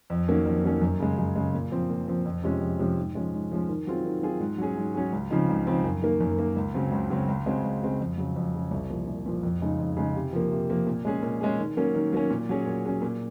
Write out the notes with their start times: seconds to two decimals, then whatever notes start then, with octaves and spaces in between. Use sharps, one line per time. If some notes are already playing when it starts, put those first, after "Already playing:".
0.10 F2
0.28 D#3 F#3 A#3 C#4
0.46 F2
0.64 D#3 F#3 A#3 C#4
0.82 F#2
0.99 C#3 G#3
1.18 F#2
1.36 C#3 G#3
1.54 A#2
1.72 F3 C4
1.90 A#2
2.08 F3 C4
2.25 F2
2.43 C3 F3 G#3 C#4
2.61 F2
2.79 C3 F3 G#3 C#4
2.98 G#2
3.15 F3 G#3 C#4
3.34 G#2
3.52 F3 G#3 C#4
3.69 D#3
3.87 F#3 C4 F4 G#4
4.05 D#3
4.22 F#3 C4 F4 G#4
4.40 G#2
4.58 F#3 C#4 G#4
4.77 G#2
4.95 F#3 C#4 G#4
5.13 C#2
5.30 C#3 F3 C4 D#4
5.49 C#2
5.67 C#3 F3 C4 D#4
5.84 F#2
6.02 D#3 A#3
6.21 F#2
6.39 D#3 A#3
6.56 C#2
6.75 C#3 F#3 C4
6.92 C#2
7.10 C#3 F#3 C4
7.28 C#2
7.46 C#3 G#3 C4 F#4
7.63 C#2
7.81 C#3 G#3 C4 F#4
8.00 F2
8.18 C#3 F#3
8.36 F2
8.54 C#3 F#3
8.71 C2
8.90 A#2 F3
9.08 C2
9.26 A#2 F3
9.43 F2
9.61 C#3 G#3 D#4
9.79 F2
9.97 C#3 G#3 D#4
10.15 C3
10.33 F3 A#3
10.51 C3
10.69 F3 A#3
10.87 A#2
11.05 G#3 C#4 G#4
11.23 A#2
11.41 G#3 C#4 G#4
11.59 D#3
11.77 F#3 A#3 C#4
11.95 D#3
12.13 F#3 A#3 C#4
12.30 A#2
12.49 F#3 C#4 G#4
12.66 A#2
12.85 F#3 C#4 G#4
13.02 A#2